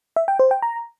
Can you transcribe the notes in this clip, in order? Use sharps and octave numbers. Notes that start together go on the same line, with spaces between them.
E5
G5
C5
G5
A#5